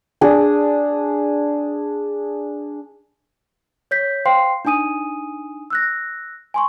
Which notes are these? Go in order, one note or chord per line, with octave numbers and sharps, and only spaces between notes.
D4 G#4
C#5 G6 B6
C5 F5 G5 C6 C7
D4 D#4 G#5 D#6 D#7
E6 F#6 A#6
G#5 C6 C#6